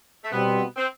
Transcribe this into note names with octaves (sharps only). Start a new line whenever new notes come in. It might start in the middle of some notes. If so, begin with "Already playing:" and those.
A3
B2 G3 B3 C4
C4